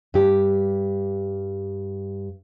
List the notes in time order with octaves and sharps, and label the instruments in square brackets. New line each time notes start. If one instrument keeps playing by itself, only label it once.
[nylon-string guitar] G2 G4